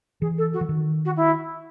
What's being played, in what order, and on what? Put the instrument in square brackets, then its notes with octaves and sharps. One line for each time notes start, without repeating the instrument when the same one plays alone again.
[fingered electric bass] E3 [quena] G#4
[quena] A4
F#4
[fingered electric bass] E3
D#3
[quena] F#4
E4